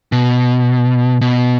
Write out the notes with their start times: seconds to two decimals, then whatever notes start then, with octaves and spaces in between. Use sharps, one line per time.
0.12 B2
1.21 B2